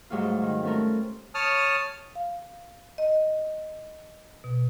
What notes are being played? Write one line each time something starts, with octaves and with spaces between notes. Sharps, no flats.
G#2 F#3 G3 A3 F4
D#3
A3 C4 C#4 A4 A#4
C#5 A5 D#6 F6
F5
D#5
B2